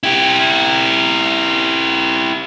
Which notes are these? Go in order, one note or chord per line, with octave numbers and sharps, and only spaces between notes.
E4 G4